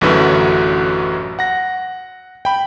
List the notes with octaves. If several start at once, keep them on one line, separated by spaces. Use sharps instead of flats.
A1 F#2 A2 D3 F#3 B4
F#5 A#6
G5 B5